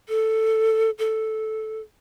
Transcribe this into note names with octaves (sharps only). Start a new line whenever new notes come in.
A4
A4